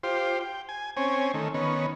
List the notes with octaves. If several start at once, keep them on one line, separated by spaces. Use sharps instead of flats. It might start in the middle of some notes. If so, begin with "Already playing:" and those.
F4 G4 C5
G5
G#5
C4 C#4 G#5
D#3 A3
D#3 B3 C#4